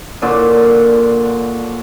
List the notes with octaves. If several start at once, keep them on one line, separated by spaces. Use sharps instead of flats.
A#2 D3 C#5 D6